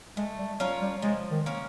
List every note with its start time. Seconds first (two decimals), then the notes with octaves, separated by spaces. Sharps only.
0.17 G#3 A3
0.39 G3
0.60 F#3 C#4 F4 A#4
0.82 G3
1.02 F3 G#3
1.31 D#3
1.46 A#3 C#4